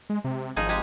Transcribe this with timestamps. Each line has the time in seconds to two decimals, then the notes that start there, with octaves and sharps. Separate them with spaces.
0.10 G#3
0.24 C3
0.56 G#1 F3 D#4 G#4
0.69 G#3 G4 G#4